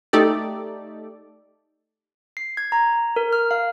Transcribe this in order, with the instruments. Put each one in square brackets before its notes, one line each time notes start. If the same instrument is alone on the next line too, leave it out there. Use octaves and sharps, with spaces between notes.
[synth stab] A3 D#4 G4 A4 D5
[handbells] C7
G#6
A#5
A#4
F6
F5